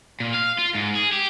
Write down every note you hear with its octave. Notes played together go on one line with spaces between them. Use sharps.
A#2
F5
F4
G#2
G#4
G4